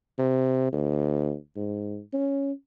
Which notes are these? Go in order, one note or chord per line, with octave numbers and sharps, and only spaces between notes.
C3
D2
G#2
C#4